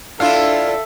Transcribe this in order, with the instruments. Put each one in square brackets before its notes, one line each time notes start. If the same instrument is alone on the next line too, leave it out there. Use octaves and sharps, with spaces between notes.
[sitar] D4 E4 F4 [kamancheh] A4 E5 [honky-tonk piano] F5